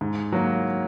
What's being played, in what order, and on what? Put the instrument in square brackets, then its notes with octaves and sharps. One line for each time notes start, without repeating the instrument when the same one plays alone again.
[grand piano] G#2
F#3 A#3